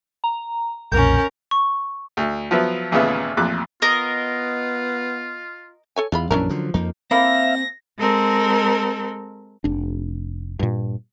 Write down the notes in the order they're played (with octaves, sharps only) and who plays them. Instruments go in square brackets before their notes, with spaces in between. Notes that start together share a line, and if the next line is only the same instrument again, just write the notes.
[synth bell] A#5
[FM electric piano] B1 F2 A#2 [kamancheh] C#4 A#4 [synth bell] G6
[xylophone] C#6
[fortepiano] D2
F3 F#3 B3 E5
A1 D#2 A#2 C#3 B3 E5
A1 F2 A#2 D6 F#6
[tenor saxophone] B3 [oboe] F4 [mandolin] A#4 D#5
[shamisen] A4 C#5 G#5
[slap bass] E2 [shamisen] G#3 F4 B5
[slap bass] A#1 F#2 E3 [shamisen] C#4 D4 A#4
[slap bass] D3 F3 F#3
[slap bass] F2 F3 A#3 [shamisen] D#4
[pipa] A#3 E4 A4 [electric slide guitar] C4 [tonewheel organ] E5 F5 [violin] A#6
[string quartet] G#3 C4 A4 A#4
[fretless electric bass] F1 D4
G2 A#2